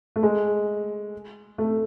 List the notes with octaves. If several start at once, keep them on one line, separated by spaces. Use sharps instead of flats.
A3
G#3
A3